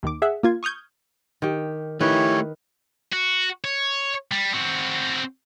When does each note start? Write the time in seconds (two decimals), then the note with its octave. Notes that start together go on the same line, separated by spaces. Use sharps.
0.03 D#2 D#3 D6
0.22 G#4 E5 F#5
0.43 A#3 F4 G#6
0.63 C#6 D#6 F6 G6 G#6
1.42 D#3 G4
2.01 D#3 A3 E4 G4 B4 C#5
3.13 F#4
3.64 C#5
4.32 G3
4.54 C4 F#4